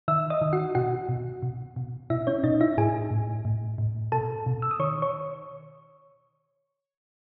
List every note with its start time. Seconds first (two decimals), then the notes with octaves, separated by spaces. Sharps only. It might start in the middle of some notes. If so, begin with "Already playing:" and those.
0.08 D#3 E5 E6
0.30 D#5 D#6
0.41 D#3
0.53 F#4 F#5
0.75 B2 F#4 F#5
1.09 B2
1.43 B2
1.76 B2
2.10 B2 E4 E5
2.27 C#4 C#5
2.44 B2 D#4 D#5
2.61 E4 E5
2.77 A2 G#4 G#5
3.11 A2
3.45 A2
3.78 A2
4.12 B2 A4 A5
4.46 B2
4.62 E6
4.71 D#6
4.79 D#3 C#5 C#6
5.02 C#5 C#6